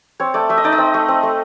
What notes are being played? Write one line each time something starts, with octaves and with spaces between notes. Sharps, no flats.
C4 C#5
A3 D5
A3 E5
D#5
D#4 D5
D#5
C4
A3
C4
A3